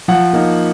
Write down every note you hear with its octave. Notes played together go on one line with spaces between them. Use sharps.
F3 F#5
A#3 D#4